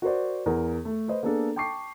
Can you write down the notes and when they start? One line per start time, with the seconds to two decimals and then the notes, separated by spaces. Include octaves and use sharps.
0.02 F#4 A#4 C5 D5
0.46 E2 A#4
0.85 A3
1.08 B4 C5 D#5
1.23 A#3 B3 D4 G#4 A4
1.56 G5 A5 C#6 D6 C7